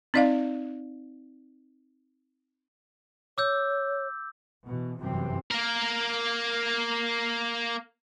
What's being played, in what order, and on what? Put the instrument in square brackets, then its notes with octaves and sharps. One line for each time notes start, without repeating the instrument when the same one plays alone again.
[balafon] C4 D#4 D5 D#5 F5
[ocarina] C#5 [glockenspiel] D6 E6 G6
[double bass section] B2 E3
G1 F#2 C3 E3 C4
[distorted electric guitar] A#3 A#4